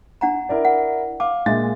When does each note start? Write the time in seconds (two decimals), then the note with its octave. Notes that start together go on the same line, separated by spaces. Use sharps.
0.21 D4 F#5 A#5
0.49 E4 A#4 D5
0.65 F#5
1.20 F5 A5 D6
1.46 A#2 G#3 D4 E5 A6